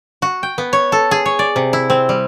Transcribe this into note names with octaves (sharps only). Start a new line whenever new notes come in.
F#4
G5
B3
C#5
A4
G#4
C#5
D5
C3
E4
C4
G3